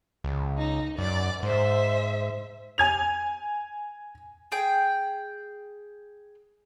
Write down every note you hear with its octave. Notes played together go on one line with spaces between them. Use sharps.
C#2
D#4
F#2 D5
G#2 C5 E5
G#5 G#6 F7
G#4 G5